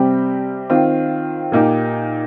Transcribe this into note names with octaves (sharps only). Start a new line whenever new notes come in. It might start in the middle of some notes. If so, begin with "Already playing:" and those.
Already playing: C3 G3 C4 G4
D#3 C4 F4
A#2 A#3 D#4 G4